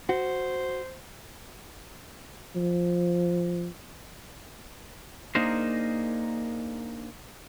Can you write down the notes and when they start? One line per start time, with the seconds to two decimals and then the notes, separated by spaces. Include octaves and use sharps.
0.09 F#4 C5
2.55 F3
5.35 A#3 D4 D#4 G#4 A#4 C5